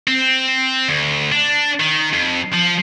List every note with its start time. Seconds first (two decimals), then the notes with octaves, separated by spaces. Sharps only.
0.07 C4
0.89 D2
1.32 D4
1.80 D#3
2.13 F2
2.53 F3